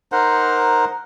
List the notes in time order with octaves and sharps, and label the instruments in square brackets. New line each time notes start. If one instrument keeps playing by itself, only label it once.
[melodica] D#4 A#4 C5 F#5